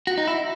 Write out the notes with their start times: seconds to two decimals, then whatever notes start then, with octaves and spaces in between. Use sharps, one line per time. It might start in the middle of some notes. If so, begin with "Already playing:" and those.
0.07 F#4
0.18 D#4
0.27 E4